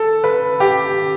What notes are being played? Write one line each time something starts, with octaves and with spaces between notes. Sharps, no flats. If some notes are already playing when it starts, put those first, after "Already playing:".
Already playing: A4
B4
G4